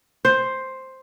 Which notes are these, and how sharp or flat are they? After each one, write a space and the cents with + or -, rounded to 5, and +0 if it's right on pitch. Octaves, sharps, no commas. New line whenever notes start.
C5 +5